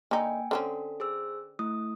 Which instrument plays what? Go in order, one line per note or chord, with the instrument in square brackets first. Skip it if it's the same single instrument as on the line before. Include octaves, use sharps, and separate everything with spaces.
[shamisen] D3 D#4 [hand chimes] A#3 G5 G#5
[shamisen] D3 C4 C#4 [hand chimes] A4
[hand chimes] G#4 C5 E6
A3 E4 D#6